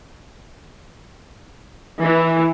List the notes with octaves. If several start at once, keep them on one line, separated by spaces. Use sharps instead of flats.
E3